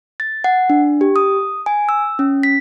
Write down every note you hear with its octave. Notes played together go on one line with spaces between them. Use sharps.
A6
F#5
D4
G4
D#6
G#5
E6
C#4
B6